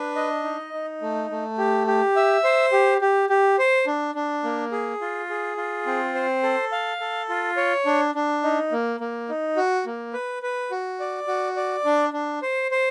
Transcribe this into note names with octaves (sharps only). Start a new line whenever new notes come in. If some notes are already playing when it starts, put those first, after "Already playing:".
Already playing: D4 B4
D#5
D#4
D#4
A3
A3
G4
G4
E5
C5
G4
G4
G4
C5
D4
D4
A#3
G#4
F4
G#4
F4
C4
C5
A4
F5
A4
F4
C#5
D4
D4
D#4
A#3
A#3
D#4
F#4
A#3
B4
B4
F#4
D5
F#4
D5
D4
D4
C5
C5